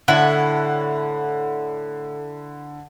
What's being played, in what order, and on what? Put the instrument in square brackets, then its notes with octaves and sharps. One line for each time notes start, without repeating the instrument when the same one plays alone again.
[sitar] A2 [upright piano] D3 [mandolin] E4 F#5